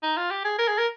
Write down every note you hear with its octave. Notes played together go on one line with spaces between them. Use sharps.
D#4
F4
G4
G#4
A#4
G#4
A#4